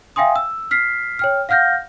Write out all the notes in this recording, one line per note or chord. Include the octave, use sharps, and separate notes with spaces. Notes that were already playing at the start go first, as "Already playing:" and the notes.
E5 F5 G5 G#5 C6 D#6
E6
F6 B6 C7
C#5 G5 F6
F5 F#5 F6 G6 A#6